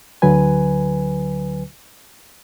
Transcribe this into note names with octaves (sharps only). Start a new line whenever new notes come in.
D2 D3 F#3 B4 G#5